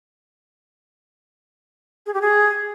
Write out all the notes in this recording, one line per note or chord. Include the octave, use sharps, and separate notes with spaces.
G#4
G4
G#4